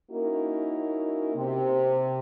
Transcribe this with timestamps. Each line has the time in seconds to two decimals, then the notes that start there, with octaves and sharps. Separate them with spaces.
0.10 A#3 C#4 D#4 E4 F#4 A#4
1.35 C3